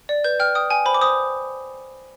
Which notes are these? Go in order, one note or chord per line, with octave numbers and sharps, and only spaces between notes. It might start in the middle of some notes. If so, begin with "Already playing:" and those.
D5
B4 G6
G5 F6
G5 D#6
G5 G#5
C5 B5
D6
C5 D#6